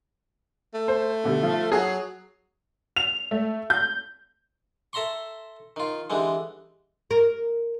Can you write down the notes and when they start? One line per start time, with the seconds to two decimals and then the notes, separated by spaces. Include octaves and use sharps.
0.74 A3
0.88 C5
1.24 B2 D3 G3
1.43 F3 F4
1.72 F#3 G#4
2.96 F7
3.31 A3
3.70 G6
4.93 A4 E5 A#5 C6 C#6
5.76 D#3 F4
6.10 D3 E3 G3 G#3
7.11 A#4